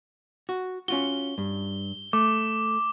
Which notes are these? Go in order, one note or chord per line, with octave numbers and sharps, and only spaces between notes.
F#4
C#4 F4 F#4 G7
G2
A3 D6